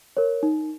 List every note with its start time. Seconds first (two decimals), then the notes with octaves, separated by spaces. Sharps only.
0.17 A#4 C#5
0.43 D#4